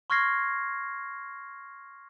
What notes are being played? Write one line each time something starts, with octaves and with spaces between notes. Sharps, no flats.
C6 C#6 F6 G#6 A#6 C7